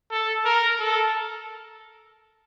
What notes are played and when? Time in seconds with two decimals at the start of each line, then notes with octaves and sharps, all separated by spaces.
0.10 A4
0.45 A#4
0.79 A4